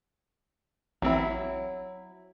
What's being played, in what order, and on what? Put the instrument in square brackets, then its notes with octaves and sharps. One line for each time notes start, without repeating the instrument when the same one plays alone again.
[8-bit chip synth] A1 C4 [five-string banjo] F#3 E4